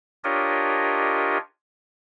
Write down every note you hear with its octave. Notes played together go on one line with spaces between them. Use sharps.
D4 F4 G4 A#4 C#5 D#5